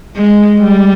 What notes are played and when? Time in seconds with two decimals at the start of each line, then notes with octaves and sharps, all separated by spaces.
0.16 G#3
0.59 G3